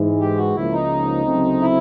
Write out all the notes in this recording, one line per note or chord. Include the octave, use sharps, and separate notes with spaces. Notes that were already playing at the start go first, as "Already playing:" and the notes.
Already playing: G#2 E3 G#3
G4
F#4
C#2 C#3 F3 A#3 E4
D#4
D2 C#3 F#3 A3 C4
E4